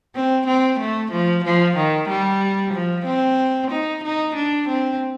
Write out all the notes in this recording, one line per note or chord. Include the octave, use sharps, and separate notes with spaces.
C4
C4
A3
F3
F3
D#3
G3
F3
C4
D#4
D#4
D4
C4